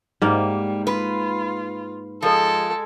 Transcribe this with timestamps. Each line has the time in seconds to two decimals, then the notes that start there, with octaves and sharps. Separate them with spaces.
0.22 G#2 G3 A#3
0.87 F4 B4
2.22 F3 G#3 A4